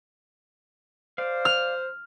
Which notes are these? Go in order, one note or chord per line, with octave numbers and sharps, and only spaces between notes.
C5 D5 F5
F6